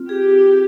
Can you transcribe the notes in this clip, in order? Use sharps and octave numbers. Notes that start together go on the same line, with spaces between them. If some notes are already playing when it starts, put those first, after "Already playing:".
Already playing: C4 F4
G4 G#4